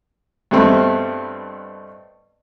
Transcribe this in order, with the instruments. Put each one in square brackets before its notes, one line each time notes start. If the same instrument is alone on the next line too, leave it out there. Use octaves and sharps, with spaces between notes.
[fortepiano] G2 B2 G3 A3 C4